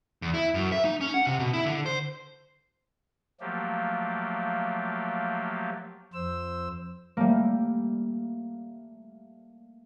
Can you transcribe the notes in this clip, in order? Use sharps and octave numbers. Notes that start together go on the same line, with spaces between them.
E2
E4
F#2
E5
D#4
C#4
F#5
C3
B2
E4
D3
C5
F3 F#3 A3 A#3 G4
F2 C5 E6
G3 A3 A#3